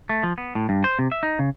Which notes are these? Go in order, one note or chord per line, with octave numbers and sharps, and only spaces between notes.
A3
F3
B3
A2
G2
C5
C3
E5
D#4
C#3